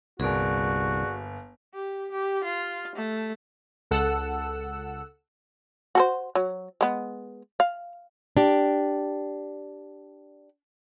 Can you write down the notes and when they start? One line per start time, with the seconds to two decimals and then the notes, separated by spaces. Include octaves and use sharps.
0.20 G1 C2 A#3 F#4 G#4 D5
1.74 G4
2.12 G4
2.44 F4
2.96 A3
3.91 C#2 A4 F#5 E6
5.95 F#4 A4 C5
6.35 F#3
6.81 G#3 B3
7.60 F5
8.37 D4 G4